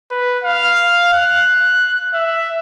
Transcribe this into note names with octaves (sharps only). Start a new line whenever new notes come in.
B4
F5
F#6
E5